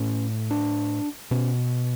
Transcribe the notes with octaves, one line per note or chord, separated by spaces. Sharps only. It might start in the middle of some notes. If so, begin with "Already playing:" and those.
Already playing: A2 C#4
D4
B2 C#4